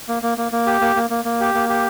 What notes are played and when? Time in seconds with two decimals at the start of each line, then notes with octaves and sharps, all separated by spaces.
0.09 A#3
0.23 A#3
0.38 A#3
0.52 A#3
0.67 G4
0.81 A#3
0.96 A#3
1.10 A#3
1.25 A#3
1.40 G4
1.54 A#3
1.69 G4